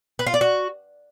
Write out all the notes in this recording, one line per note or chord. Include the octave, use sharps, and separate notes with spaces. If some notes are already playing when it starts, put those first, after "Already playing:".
B4
F4
D5
F#4